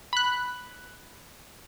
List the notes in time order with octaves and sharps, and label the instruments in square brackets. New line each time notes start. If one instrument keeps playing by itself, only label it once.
[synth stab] B5 F#6